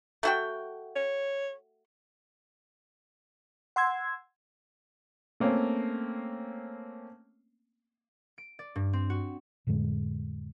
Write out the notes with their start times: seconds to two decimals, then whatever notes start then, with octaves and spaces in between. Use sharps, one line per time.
0.23 A3 F#4 G5
0.96 C#5
3.76 F#5 C6 E6 G#6
5.40 A3 A#3 C4 C#4
8.38 D7
8.59 D5
8.75 G2
8.93 C4
9.10 F#4
9.67 F2 A2 D3 G#3